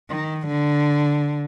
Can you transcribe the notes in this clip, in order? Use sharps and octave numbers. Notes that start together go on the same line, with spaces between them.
D#3
D3